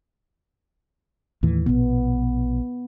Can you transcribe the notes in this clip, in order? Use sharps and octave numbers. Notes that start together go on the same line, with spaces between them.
D#2 A2 E3
A#1 B2 B3